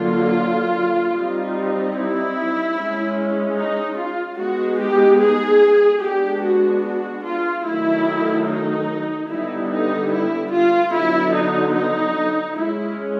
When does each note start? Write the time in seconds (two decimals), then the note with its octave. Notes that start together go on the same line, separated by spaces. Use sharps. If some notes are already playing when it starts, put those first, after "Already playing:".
Already playing: D3 F#3 A#3 F4
1.12 G3 C4 D#4
1.94 E4
2.75 G#3 C#4
3.57 D#4
3.97 F4
4.38 G#3 B3 D#4 F#4
4.79 G4
5.20 G#4
6.01 G#3 B3 D4 G4
6.43 F#4
6.83 F#4
7.24 F4
7.65 D#3 F#3 A3 E4
8.47 D#4
9.28 D3 G3 B3 D#4 E4
9.69 D#4
10.11 E4
10.51 F4
10.91 D3 F#3 B3 E4
11.33 D#4
11.74 D#4
12.55 G#3 C#4 E4